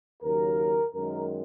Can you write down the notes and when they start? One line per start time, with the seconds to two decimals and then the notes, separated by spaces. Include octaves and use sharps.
0.22 D#2 C#3 F#3 A#4
0.93 F#2 D#3 G#3 A#4